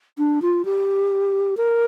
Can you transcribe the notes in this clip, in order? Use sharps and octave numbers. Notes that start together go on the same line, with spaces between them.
D4
F4
G4
A#4